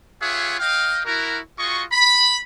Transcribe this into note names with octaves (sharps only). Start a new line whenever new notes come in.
F4 G4 G#4 C#5 E5 F#5
D#5 F5 G5
E4 F#4 A#4
F4 F#4 G#4 D#5 C#6
B5